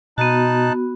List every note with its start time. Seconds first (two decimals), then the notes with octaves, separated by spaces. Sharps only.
0.18 B2 B3 D#4 F#4 A5 F#6